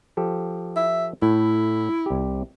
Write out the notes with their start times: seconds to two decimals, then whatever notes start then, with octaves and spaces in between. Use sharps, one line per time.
0.17 F3 G4 A4
0.76 E5
1.22 A2 E4
2.06 C2 G4